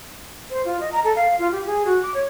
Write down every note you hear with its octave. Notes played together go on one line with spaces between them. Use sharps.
C5
F4
D#5
A#5
A4
F5
F4
G4
G#4
F#4
D6
C#5